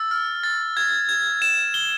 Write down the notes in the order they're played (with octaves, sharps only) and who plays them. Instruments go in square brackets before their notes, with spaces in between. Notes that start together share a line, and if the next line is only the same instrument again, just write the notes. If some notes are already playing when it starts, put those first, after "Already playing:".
Already playing: [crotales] E6 A6
F6
A6
G#6
G#6
E7
G7